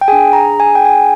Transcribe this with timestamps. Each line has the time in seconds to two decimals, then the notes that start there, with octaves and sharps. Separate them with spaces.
0.01 G5
0.08 D4 G#4 G#5
0.33 A#5
0.60 G#5
0.75 G5
0.85 G#5